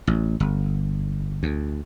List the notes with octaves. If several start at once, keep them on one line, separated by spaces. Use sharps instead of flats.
A1
G1
D2